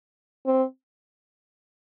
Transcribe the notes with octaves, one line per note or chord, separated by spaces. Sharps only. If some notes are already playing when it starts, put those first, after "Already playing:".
C4